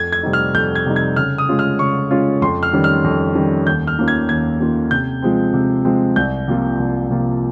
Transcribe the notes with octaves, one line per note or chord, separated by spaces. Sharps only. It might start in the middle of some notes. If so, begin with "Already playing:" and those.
Already playing: F2 G#6
G#6
C3 G3 C4 D#4
F6
F2 G6
G#6
C3 G3 C4 D#4
G#6
C#3 F6
D#6
G#3 C#4 F4
F6
C#3 C#6
G#3 C#4 F4
F2 C6
F6
D#3 G3 C#4
F6
F2
D#3 G3 C#4
D#2 G6
F6
D#3 A#3 C#4 F4
G#6
D#2 G#6
D#3 A#3 C#4 F4
C3 G6
F3 G#3 C4
C3
F3 G#3 C4
C2 G6
C3 F3 A#3 F4
C2
C3 F3 A#3 F4